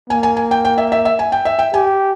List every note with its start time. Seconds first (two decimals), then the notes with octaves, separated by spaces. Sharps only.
0.10 A#3 G#5
0.23 G#5
0.37 G#5
0.51 G5
0.65 G5
0.78 E5
0.92 E5
1.05 E5
1.19 G#5
1.32 G5
1.45 E5
1.59 G5
1.74 G4 G#5